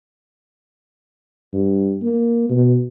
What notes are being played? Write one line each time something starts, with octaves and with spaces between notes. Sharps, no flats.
G2
A#3
B2